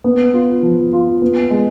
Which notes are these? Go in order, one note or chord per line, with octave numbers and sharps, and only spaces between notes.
B3
F4
F3
F4
B3
G#3